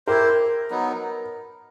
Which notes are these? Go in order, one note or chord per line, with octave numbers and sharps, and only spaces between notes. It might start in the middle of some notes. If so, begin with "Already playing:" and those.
E4 G4 A#4 C5
F#3 B3 D#4